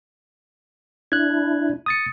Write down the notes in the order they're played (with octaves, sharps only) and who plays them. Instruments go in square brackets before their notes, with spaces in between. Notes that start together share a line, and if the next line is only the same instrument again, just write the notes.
[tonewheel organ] D4 E4 [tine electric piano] F#6 G#6
[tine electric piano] D#6 A6 C#7